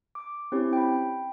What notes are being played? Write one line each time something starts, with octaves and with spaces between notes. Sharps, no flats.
D6
C4 C#4 E4 G4 C#5
G5 B5